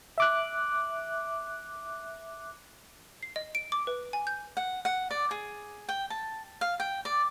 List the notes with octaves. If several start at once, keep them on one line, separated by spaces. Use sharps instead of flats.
E5 D6 F#6
C7
D#5
D7
D6
B4
G#5
G6
F#5
F#5
D5
G#4
G5
A5
F5
G5
D5